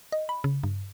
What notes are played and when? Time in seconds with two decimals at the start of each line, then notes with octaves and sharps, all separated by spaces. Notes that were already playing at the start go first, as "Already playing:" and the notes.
0.12 D#5
0.29 B5
0.44 C#3
0.63 G2